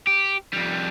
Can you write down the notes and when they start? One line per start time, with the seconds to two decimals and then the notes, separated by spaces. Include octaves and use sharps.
0.07 G4
0.54 F2 G3